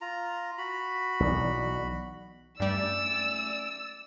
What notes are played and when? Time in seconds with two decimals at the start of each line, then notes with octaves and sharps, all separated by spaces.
0.01 F4 A#5
0.58 F#4 B5
1.20 B1 E3 D5
2.60 G2 G3 A3 C#4 D5 E6